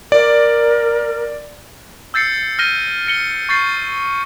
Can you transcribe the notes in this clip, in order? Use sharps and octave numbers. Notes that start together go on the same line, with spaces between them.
A#4 D5
E6 G6 A6 C7 C#7
F6 G6 A#6 D#7 G7
A#6 C#7 G7
C#6 G6 A6 C7